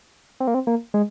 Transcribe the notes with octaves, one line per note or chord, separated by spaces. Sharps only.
C4
A#3
C4
A#3
G#3